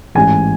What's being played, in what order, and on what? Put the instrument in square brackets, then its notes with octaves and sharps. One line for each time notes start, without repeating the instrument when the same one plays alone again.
[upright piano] A1 G#2 E3 G#5